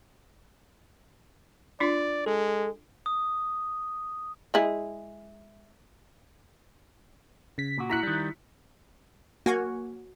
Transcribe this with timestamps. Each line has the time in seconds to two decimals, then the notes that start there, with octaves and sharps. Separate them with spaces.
1.80 D4 F4 D5
2.26 G#3 A4
3.06 D#6
4.54 G#3 E4 G#4
7.58 C#3 B6
7.78 A#2 F#4
7.90 E4 A#5 F#6 B6 C#7
8.03 D#3 G3
9.46 A#3 F#4 G#5 C#6